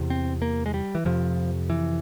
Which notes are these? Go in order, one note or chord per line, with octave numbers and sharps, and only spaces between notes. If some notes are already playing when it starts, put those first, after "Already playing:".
Already playing: E2 C3
C4
A#3
G#3
G3
E3
F2 C3 F3
E3